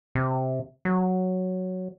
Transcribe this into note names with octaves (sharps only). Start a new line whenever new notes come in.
C3
F#3